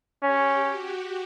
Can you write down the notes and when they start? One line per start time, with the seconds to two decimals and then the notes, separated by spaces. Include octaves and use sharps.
0.23 C#4 G4
0.69 F#4